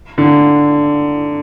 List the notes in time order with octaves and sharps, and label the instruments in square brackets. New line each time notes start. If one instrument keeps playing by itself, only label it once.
[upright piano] D3